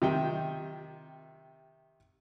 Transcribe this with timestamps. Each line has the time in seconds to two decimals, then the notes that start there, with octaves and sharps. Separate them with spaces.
0.02 C3 D#3 G5